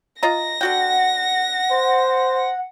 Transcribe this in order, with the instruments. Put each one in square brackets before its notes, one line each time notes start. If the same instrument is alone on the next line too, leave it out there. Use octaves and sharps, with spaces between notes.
[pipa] F4 D#5 A#5 [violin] A#6
[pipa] D3 F#4 G5 [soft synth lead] F#5
[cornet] C5